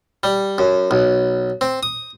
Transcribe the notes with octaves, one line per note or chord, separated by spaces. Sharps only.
G3
F#2
B1
C4
D#6